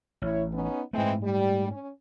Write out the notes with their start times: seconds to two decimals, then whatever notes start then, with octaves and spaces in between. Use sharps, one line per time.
0.22 A1 E4 C#5
0.53 B3 C#4 D#4
0.93 G#2 E3 G#3 A3 C4
1.23 G3
1.68 C#4